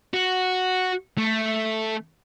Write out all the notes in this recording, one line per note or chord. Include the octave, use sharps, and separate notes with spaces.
F#4
A3